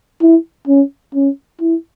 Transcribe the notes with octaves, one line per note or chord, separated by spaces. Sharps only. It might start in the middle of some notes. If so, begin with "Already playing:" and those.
E4
C#4
C#4
E4